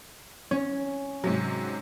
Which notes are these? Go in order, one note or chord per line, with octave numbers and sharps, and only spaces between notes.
C#4
G#2 C3 F#3